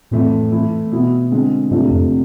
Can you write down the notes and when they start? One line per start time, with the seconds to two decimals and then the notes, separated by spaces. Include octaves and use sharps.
0.11 F2 A2 E3 A3 E4
0.52 E3 A3 E4
0.91 B2 B3 E4
1.31 D3 G#3 C4
1.71 G#2 C3 F3 A3 D4 F4
1.91 F2